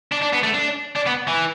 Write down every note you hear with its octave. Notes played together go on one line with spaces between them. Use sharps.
D4
D4
B3
A3
D4
D4
B3
E3